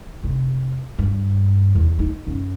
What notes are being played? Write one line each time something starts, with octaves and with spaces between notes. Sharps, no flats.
F1
G2
E2
D#4
F#2